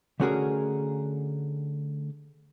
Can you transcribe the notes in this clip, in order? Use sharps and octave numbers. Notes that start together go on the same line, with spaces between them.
D3 A3 C#4 F#4 G#4 A#4